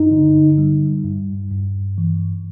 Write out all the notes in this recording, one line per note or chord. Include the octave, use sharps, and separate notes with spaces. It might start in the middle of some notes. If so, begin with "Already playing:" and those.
Already playing: G2 D#4
D3
G3
G2
G2
E3